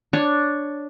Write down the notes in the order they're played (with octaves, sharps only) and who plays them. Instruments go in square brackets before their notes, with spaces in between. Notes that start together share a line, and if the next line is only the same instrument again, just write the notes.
[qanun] D4 C#5